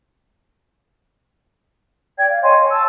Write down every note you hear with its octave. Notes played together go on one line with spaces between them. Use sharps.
D5 G5 G#6
F5
C#5 D#5 G#5 C6
C#5
A5 E6